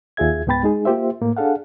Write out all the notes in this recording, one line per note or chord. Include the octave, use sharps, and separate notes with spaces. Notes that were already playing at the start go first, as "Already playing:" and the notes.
D#2 F4 G#4 E5 G#6
C#2 G#2 B3 G5 B5 A6
G#3 D#4 G#4
A#3 F4 G4 C5 E5
A2 A#3
D4 G#4 A4 F5 F#5